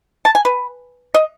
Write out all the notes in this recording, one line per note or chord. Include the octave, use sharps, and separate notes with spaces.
A5
G#5
B4
D#5